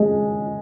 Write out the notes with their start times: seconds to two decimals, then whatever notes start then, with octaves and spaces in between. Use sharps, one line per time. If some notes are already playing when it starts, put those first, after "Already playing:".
Already playing: G#3